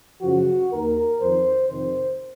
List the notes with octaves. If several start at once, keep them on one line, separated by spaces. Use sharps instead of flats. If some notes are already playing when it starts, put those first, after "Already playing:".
F#2 C#3 F3 F#4
D#2 D#3 A#4
F2 D#3 C5
F2 C3 D#3 C5